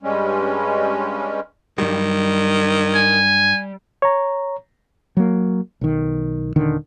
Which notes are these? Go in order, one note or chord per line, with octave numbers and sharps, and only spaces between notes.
G2 G3 G#3 C#4
G2 D#3 F#3 G3
G#5
C#5 A#5
F#3 A#3
B1 D#3
D#1 D3 D#3